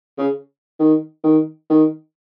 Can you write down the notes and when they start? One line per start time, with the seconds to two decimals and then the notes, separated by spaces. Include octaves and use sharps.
0.18 C#3
0.80 D#3
1.24 D#3
1.70 D#3